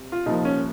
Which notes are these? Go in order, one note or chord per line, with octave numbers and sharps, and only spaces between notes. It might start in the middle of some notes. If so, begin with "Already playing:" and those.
Already playing: C3
F4
C2 A#2 F3 D#4
C#4